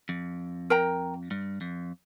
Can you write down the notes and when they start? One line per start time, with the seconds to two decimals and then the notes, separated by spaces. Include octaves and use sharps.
0.09 F2
0.70 A#4 G5 A#5
1.31 G2
1.61 F2